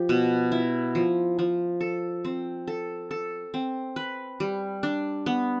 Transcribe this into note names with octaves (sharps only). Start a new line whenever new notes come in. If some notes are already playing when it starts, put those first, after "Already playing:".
Already playing: F3 G4
B2
E4
F3
F3
A4
C4
A4
A4
C4
B4
G3
D4
B3